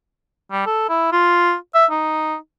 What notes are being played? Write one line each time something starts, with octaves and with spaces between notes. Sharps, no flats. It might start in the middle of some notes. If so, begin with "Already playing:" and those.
G3
A4
E4
F4
E5
D#4